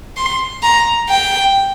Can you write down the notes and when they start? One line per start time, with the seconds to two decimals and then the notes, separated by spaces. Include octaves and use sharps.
0.17 C6
0.63 A#5
1.10 G5